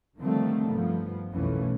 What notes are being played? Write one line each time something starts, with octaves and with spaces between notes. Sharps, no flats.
D3 D#3 F3 G3 A3 C4
G2 F3 B3
B1 F2 D#3 E3 A3 C#4